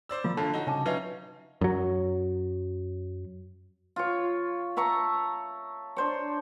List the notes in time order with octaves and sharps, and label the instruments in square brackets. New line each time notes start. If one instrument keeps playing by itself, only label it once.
[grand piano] C5 D5 E6
[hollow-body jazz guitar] F3 A#3 [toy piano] F4
[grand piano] F#2 D3 F4 [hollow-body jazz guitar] A4 C#5 [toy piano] A5
[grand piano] D#4 F#4
[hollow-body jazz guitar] C2 C#3 C#4 [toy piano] D4 A5 D6
[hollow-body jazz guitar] F#3 [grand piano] C#4 D#4 F4 [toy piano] B4 E5
[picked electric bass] F#2 F#3
[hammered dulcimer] F4 C#5
E5 A5 A#5 C#6
D4 C5 C#5